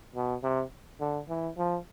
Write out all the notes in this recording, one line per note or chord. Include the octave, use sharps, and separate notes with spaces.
B2
C3
D3
E3
F3